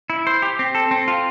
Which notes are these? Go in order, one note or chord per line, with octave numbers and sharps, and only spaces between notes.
E4
C5
G4
C4
A4
C4
F4